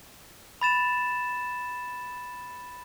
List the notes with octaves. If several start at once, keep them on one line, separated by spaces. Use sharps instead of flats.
B5 A6 E7